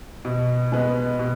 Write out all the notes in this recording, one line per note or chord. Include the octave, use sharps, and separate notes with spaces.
B2
G#3 B3
B2